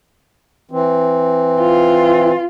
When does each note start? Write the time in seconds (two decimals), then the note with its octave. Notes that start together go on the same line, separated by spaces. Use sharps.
0.71 E3 C4
1.60 F4